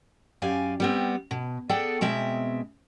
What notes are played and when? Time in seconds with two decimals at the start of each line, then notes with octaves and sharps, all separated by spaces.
0.42 F#2 G4 D5 F5 G#5
0.80 G3 B3 C4
1.31 B2
1.69 B3 G#4 A4 D5 G5
2.01 B2 G#3 C4 E5